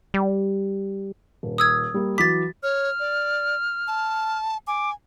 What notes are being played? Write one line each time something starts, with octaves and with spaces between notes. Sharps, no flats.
G3
D#1
D#6 E6 G#6
G3 A#3
E3 F#3 D6 A6 B6
C#5 F6
D5
A5
G#5 D6